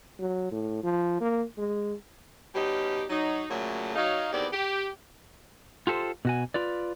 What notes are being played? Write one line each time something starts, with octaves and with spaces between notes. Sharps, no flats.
F#3
A2
F3
A#3
G#3
B2 G3 C#4 D#4 G4
F#3 D#4
A#2 C#3 F#3 A3
F#3 D#4 F5
E2 D#3 B3 C4 G4 D5
G4
F4 G4 A4 B4 C5
B2 F#4 G#5
F4 B4 D5